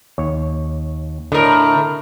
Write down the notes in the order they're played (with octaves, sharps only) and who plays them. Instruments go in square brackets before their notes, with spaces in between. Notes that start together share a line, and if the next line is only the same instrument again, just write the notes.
[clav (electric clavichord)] D#2 C#5
[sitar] A2 A#4 [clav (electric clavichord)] D3 D#5